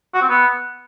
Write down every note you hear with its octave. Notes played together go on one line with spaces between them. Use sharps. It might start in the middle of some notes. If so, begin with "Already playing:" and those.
F#4
C4
B3